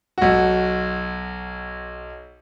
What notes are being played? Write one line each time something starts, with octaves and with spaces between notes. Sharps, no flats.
B1 F#4